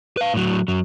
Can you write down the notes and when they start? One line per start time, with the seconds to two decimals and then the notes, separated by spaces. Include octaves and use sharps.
0.17 B4 F5
0.34 A2 F#3
0.68 F#2 F#3